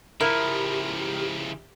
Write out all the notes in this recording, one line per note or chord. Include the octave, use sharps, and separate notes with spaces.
C#3 F3 E4 G4 A#4